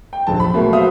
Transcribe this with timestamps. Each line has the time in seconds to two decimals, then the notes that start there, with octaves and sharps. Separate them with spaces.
0.13 G5
0.27 F1 A#1 A5
0.40 B5
0.54 B2 F#3 A3 A#3
0.73 F#4 C5 E5 F5 D#6